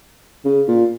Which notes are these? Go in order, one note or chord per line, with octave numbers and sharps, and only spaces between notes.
C#3
A#2